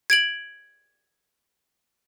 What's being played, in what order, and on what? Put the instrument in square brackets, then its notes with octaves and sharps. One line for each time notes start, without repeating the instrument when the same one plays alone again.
[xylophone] G#6 D7 F#7